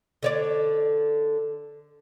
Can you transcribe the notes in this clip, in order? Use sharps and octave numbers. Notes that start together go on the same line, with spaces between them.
D3 C#5 D5